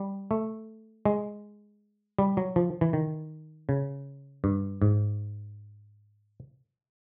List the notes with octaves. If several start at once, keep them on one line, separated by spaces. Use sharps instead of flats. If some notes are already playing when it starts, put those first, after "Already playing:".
Already playing: G3
A3
G#3
G3
F#3
F3
E3
D#3
C#3
G2
G#2